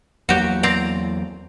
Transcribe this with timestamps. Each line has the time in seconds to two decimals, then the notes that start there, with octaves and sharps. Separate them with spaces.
0.29 E2 F#3 A#3 F#4 G4
0.63 C4 D5 A#5